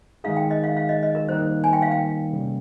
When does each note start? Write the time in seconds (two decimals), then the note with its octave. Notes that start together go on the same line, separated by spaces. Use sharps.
0.24 D#3 G#3 D#4 G#4 F5
0.37 G5
0.51 D#5
0.64 F5
0.77 F5
0.89 D#5
1.03 D#5
1.15 A#4
1.29 D#3 G3 A#3 D#4 C5
1.64 G#5
1.73 G5
1.82 F5
1.91 G5
2.33 C3 G3 A#3 C#4